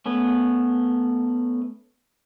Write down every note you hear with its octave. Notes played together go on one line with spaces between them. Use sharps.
A3 B3 C#4